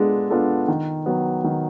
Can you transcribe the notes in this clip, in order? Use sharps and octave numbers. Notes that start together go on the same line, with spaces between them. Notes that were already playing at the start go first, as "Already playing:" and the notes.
Already playing: G#3 B3 D4 F4 A4
B3 D4 F4 A4
D#3
F#3 B3
D#3